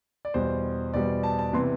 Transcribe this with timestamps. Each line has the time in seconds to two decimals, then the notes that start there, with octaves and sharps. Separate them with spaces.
0.25 D5
0.34 E2 B2 G3 C5
0.94 E2 B2 G3 D5
1.23 A5
1.39 A5
1.53 C3 E3 B3 C6